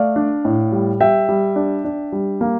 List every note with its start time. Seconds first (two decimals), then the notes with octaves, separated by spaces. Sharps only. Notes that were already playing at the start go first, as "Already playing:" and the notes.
Already playing: A3 D5 F5
0.16 D4
0.45 A2
0.72 G3
1.00 G3 E5 G5
1.29 G3
1.56 D4
1.85 D4
2.12 G3
2.41 A#3